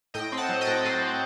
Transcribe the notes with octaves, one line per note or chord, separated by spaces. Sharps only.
A2 D#5 G5
C4
F#5 A5
F#3
D#5 G5
A2
A2 C5 D#5
C4